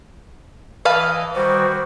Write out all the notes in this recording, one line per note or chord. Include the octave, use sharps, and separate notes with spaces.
E3 B4 D#5 F5 A5
D#3 G3 F#4 C5